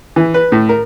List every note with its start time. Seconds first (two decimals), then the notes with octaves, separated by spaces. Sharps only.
0.16 E3
0.34 B4
0.52 A2
0.69 A#4